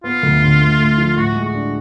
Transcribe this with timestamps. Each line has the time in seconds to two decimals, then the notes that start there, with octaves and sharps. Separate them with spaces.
0.04 B3 F4
0.23 D2
0.42 D3
0.60 A3
0.79 A3
0.98 F3
1.17 A2 F#4
1.36 G#3
1.45 F#4
1.54 D4